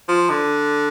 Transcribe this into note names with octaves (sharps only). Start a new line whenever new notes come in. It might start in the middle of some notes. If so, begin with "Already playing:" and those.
F3
D3